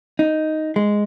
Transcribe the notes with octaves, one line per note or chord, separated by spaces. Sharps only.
D#4
G#3